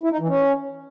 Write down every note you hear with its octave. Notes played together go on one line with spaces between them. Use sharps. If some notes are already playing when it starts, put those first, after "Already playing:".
E4
D#4
E3
C#4